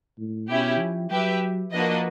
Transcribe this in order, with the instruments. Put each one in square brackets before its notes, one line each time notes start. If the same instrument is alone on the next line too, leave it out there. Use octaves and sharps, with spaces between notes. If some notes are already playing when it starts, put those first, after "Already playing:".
[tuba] A2
[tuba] B2 [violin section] C#4 E4 G4
[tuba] F3
[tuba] F#3 [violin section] G4 B4 E5
[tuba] F3 [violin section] A#3 D4 F#4 B4 D#5